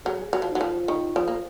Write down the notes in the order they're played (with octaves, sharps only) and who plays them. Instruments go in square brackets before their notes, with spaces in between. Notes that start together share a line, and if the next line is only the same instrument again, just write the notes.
[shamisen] F#3 [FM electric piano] G#4
[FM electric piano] G#4
[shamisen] F#3 [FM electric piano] F#4
[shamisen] F3
[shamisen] F#3 [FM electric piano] D#4
[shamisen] F3 [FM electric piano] F4
[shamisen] D#3
F3
A#3